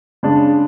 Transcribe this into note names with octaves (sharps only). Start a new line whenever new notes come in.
C#3 G#3 D4